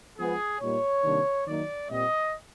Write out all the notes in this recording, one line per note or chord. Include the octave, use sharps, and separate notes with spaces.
F3 G#3 B3 G#4
A#2 G3 A#3 D#4 C#5
C3 D#3 G3 A#3 D4
D#3 F#3 A#3 D#4 D5
A#2 G3 C4 D#5